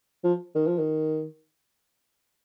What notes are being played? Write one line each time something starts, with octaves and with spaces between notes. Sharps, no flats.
F3
D#3
F3
D#3